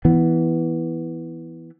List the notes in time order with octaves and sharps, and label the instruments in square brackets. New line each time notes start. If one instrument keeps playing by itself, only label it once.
[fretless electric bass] E3 B3